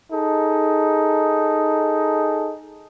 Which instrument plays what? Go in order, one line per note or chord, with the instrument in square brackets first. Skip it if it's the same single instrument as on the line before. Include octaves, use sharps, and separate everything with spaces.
[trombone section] D#4 G#4 A4